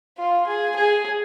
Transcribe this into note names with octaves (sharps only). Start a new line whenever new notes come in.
F4
G#4
G#4